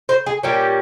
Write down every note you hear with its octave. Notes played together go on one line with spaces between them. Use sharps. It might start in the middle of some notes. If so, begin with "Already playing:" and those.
C5
G#4
A#2 G3 A#3 C#4 G4